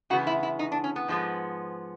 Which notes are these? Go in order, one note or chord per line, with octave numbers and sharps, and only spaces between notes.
C#3 E3 G#3 B3 F#4
E4
E4
D#4
D4
C#4
B3
G#2 F3 G#3 B3